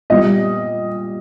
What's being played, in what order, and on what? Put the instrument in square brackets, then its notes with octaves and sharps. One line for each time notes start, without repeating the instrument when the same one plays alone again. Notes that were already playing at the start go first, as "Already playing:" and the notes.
[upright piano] A#2 G3 D#5